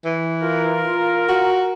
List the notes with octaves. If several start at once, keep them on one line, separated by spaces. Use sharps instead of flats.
E3
F4 A#4
F#4